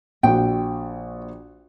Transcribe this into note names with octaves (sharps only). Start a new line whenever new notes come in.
A#1 F#4 G5